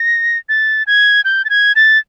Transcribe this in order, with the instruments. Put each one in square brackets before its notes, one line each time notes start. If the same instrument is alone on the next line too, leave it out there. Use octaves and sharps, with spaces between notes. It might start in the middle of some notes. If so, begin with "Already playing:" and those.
Already playing: [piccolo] A#6
A6
G#6
G6
A6
G#6
A6